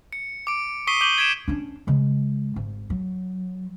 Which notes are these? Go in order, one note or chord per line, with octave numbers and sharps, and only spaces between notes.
C#7
D6 D7
C#6 D#6 B6 C7 D#7 G7
D6 G6 D#7 F#7 G7
G#6 B6 D7 E7
C#4 D4
C#3 G#3
G#1
F#3